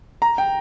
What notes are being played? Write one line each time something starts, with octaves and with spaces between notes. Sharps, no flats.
A#5
G5